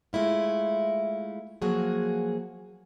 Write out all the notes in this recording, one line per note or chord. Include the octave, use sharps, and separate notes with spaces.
G#3 A3 E4 F4
F3 F#3 A#3 F#4 G#4